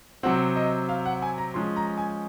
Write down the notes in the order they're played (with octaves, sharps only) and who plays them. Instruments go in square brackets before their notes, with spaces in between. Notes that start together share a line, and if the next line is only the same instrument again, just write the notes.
[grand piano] C3 F#3 C4 F#5
D#5
F5
F#5
G#5
A#5
F3 G#3 C#4 C6
A#5
G#5